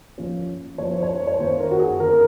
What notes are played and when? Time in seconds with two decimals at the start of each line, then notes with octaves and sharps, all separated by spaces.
0.18 F3 A#3 C#4
0.78 F3 A#3 C#4 C#5
0.90 C5
1.03 C#5
1.27 C#5
1.39 D#3 A#3 C#4 C5
1.60 A#4
1.71 F#4
1.80 G#4
2.00 D#3 A#3 C#4 A#4